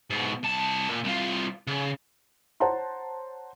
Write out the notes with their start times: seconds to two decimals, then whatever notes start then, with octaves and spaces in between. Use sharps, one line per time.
0.10 G#2 B2
0.43 C2 A5
0.89 A#2
1.04 C2 F4
1.67 C#3
2.60 C5 C#5 F#5 A5 A#5 C6